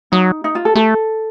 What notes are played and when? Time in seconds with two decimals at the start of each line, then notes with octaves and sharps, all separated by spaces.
0.12 F#3 D#4
0.44 D#4
0.55 F4
0.65 A4
0.75 A3 A4